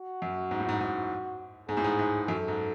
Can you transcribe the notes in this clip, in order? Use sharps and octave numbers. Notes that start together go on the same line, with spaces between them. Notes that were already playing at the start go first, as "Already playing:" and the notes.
Already playing: F#4
F#2
G#2
A2
G#2
G#2
G#2 G#4
A2
G#2
G#2
F#2 A4
G#2